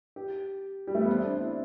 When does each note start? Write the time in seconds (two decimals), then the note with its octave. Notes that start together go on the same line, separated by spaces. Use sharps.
0.16 G4
0.88 G3
0.95 A3
1.02 B3
1.09 C4
1.24 D4
1.40 E4